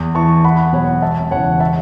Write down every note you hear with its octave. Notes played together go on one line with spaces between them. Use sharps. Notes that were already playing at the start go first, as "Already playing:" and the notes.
Already playing: E2
E3 A5 C#6
E2 F#5 B5
B2 F#3 C#5 F#5
E1 E5 A5
E2 C#3 E3 C#5 F#5
E5 A5